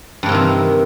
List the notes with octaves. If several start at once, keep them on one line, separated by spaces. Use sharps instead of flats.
G2 C3 D#3 E3 A#3